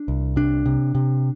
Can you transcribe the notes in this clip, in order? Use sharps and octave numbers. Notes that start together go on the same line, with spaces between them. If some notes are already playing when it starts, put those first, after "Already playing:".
Already playing: D4
C2
C3 D4
C3
C3